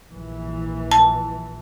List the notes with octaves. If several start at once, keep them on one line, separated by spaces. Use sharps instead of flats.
A#1 E3
A5